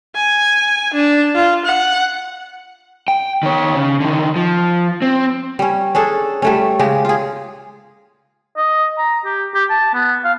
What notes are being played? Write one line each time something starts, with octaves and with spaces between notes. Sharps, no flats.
G#5
D4
F4
F#5
G5
D#3 C#5
C#3
D3 D#3
F3
C4
G3 C#4
C#4 D4 G#4 A4
G3 A3 C#4
C#3 G#3 G4
F4 G#4
D#5
A#5
G4
G4
A5
B3
F5